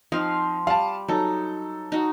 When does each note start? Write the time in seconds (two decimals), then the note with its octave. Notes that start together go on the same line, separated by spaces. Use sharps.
0.12 F3 C4 D#4 F5
0.67 G3 F5 A5
1.08 F#3 D#4 A4
1.92 D#4 F#4